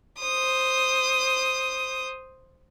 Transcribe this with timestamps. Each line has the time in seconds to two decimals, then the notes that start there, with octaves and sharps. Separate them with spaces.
0.19 C5 D#6